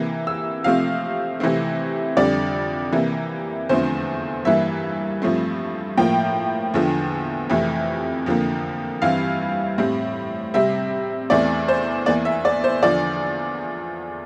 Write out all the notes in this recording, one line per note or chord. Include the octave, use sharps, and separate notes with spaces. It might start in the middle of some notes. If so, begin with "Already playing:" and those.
Already playing: C3 E3 A#3
E6
C3 F3 A3 C4 F5
C3 E3 A3 C4
F2 D3 G3 D5
C3 E3 A#3
E2 D3 F3 A3 C4 C5
G2 E3 A#3 E5
G2 F3 A3 C4
A2 F3 A#3 G5
E2 D3 F3
F2 C3 E3 A3
F2 D3 F3 A#3
G2 E3 G3 C4 F5
A2 G3 C4
C3 G3 C4 E5
E2 E3 A3 C4 D5
C5
E2 E3 A#3 D5
E5
D5
C5
E2 D3 F3 D5